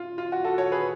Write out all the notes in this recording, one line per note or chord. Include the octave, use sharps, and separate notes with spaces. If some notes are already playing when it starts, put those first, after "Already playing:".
Already playing: F4
F4
F#4
F#4 A4
A4 C#5
G#4 B4